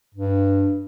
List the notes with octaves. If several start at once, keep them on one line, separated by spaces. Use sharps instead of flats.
G2